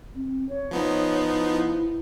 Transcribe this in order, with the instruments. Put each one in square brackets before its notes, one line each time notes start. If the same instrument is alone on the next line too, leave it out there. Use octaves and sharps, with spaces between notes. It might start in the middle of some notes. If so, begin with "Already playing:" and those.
[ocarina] C4
C#5
[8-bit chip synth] F3 B3 D#4
[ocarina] E4